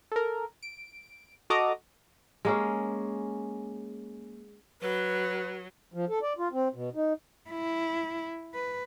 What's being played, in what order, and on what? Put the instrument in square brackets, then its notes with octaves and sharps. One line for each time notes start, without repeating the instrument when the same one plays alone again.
[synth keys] A4 A#4
D7
F#4 A4 D#5 A#5 D6 D#6
[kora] G#3 A#3 C#4
[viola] F#3 [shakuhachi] B4
[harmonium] F3
A4
D5
F4
C4
B2
D#4
[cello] E4
B4